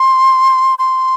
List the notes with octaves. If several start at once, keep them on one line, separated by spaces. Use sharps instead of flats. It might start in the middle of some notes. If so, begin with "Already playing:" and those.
Already playing: C6
C6